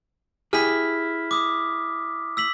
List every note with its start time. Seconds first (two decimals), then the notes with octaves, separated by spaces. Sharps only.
0.53 E4 G4 G#4 F6 B6
1.31 D6 D#6
2.37 E6 B6 F#7